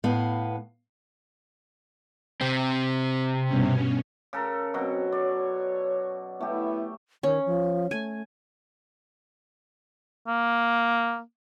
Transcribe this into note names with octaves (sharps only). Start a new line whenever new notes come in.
A2 B3 B4 F5
C3 C4
G2 B2 C#4
C#3 A4 A#4
B2 F#3 C4
C#5 D5
A3 B3 E4 G4
D#3 C#4
F3
A3 G#5
A#3